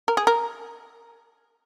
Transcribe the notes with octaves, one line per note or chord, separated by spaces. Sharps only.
A#4
G#4
A#4